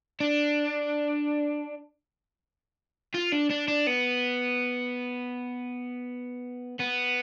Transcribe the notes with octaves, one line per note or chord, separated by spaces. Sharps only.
D4
F4
D4
D4
D4
B3
B3